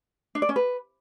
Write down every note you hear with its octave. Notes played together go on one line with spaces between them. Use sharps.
D4
D5
C#4
B4